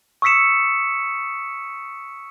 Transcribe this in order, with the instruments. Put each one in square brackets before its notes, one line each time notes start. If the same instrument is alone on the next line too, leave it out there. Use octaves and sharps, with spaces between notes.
[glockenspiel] C#6 D#6 E6 B6 C#7 E7